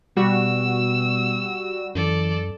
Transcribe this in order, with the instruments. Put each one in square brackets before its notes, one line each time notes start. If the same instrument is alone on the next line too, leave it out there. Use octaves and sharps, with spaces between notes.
[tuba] B2 [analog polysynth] G3 F#4 [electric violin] E6
[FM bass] F#2 [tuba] E3 [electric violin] A4 D5